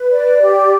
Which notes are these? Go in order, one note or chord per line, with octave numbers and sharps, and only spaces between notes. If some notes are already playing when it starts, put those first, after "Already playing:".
Already playing: B4
D5
G4